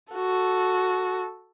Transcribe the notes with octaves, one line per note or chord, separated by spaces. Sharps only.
F#4 A4